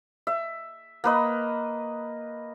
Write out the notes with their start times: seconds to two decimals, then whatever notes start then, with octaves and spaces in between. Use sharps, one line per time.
0.27 E5
1.04 A#3 B4 D#5